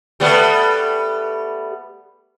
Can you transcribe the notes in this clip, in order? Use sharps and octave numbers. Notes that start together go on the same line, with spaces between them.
G3 A3 B3